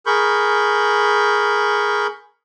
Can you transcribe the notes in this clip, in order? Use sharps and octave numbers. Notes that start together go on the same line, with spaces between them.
G#4 A#4 B5 C#6 G6